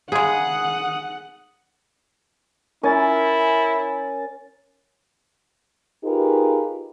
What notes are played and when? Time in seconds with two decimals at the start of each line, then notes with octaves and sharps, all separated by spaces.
0.12 C#3 G#3 G#4 F#5 D#6
2.83 C#4 E4 A#4 G#5 A6
6.03 D#4 F4 G4 G#4 A#4 B4